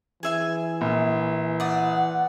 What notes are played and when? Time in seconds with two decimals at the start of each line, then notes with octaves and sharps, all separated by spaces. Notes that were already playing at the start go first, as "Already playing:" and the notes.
0.23 E3 G#4 E5 G#5
0.81 A#1
1.60 D5 F#5 D#6